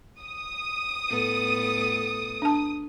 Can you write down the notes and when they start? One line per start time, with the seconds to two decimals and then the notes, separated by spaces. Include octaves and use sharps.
0.22 D#6
1.09 A2 B3 A4
2.42 D4 A5